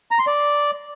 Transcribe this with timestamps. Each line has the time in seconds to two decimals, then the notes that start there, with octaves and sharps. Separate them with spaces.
0.11 A#5
0.19 C6
0.27 D5